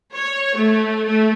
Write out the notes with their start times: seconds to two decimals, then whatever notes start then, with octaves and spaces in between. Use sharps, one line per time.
0.15 C#5
0.56 A3
1.05 A3